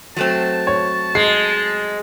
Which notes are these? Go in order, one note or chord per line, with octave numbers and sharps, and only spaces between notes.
F#3 A3 C4 A5
C#5
G#3 C7